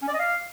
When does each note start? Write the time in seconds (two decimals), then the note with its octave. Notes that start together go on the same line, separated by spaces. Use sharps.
0.02 C#4
0.08 D5
0.14 D#5
0.19 F5